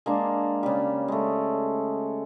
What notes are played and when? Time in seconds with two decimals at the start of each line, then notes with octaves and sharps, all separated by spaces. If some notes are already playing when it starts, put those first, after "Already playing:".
0.06 G#3 A#3 D4
0.63 C#3 G3
1.08 G#3 A3